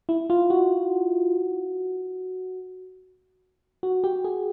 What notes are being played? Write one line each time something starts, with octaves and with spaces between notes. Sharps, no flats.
E4
F4
F#4
F#4
G4
G#4